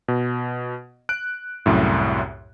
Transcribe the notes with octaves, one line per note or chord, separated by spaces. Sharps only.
B2
F#6 D7
C2 F#2 A2